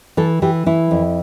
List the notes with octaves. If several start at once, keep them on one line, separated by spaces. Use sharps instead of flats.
E3 A4
E3 G4
E3 E4
F2